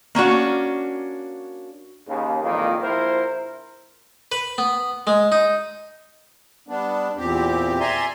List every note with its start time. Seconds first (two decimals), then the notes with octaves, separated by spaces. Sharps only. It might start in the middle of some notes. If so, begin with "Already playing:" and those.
0.15 A#3 C#4 D4 F#4
2.08 D#2 C#3
2.42 F2 A#2 D#3 E3 G#3 A#3
2.82 A#1 E4 A#4 C5
4.32 B4
4.58 B3
5.07 G#3
5.32 D#4
6.68 G3 B3 D4
7.17 E2 A#2 C4 G4
7.80 D5 E5 G#5 A#5 C6